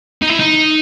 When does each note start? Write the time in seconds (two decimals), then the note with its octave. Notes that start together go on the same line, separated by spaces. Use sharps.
0.22 D#4
0.30 E4
0.39 D#4